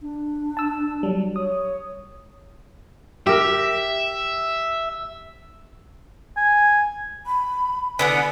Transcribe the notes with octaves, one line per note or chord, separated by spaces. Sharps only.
D4
A5 E6
F#3 G3
C#5 D#6
G4 A#4 E5
G#5
B5
D3 B3 E4 F#5 G#5